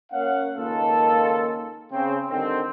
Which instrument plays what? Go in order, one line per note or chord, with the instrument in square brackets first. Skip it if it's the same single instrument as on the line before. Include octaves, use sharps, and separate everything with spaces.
[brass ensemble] A#3 C#4 C#5 F5 F#5
C#2 D#3 A#3 F4 A4
C#3 C4
D3 D#3 G3 C4